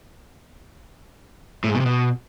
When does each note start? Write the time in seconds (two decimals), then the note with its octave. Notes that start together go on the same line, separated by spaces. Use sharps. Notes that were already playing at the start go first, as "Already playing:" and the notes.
1.64 A2
1.69 G#2
1.75 B2
1.80 C3
1.86 B2